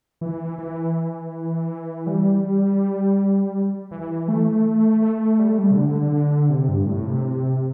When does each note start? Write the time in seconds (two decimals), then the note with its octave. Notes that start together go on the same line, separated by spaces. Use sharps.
0.21 E3
0.59 E3
2.07 G3
3.91 E3
4.28 A3
5.02 A3
5.39 G3
5.48 A3
5.58 G3
5.71 C3
5.76 D3
6.50 C3
6.69 G2
6.87 A2
7.06 C3